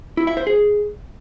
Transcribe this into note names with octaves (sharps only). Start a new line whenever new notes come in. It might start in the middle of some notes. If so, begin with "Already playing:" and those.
E4
E5
C5
G#4